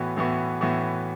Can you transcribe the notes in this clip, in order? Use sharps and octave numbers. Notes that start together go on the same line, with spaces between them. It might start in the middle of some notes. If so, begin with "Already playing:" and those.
Already playing: A2 E3 B3 F#4
A2 E3 B3 F#4
A2 E3 B3 F#4